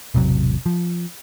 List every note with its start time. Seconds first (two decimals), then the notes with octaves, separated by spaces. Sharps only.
0.15 E1 A1 C3 F#3
0.66 F3